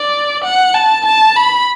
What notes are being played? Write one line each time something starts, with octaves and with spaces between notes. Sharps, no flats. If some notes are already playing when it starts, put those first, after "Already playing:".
Already playing: D5
F#5
A5
A5
B5